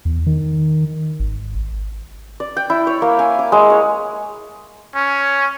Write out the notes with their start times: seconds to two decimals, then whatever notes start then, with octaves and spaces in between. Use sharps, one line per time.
0.05 E2
0.26 D#3
1.20 G#1
2.40 D5
2.57 G5
2.70 E4
2.87 C#5
3.02 A#3
3.19 G#5
3.39 D6
3.52 G#3
3.70 C#5
4.95 C#4